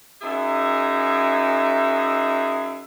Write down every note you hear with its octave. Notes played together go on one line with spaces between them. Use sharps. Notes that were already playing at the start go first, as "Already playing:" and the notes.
F#2 D#4 G#4 E5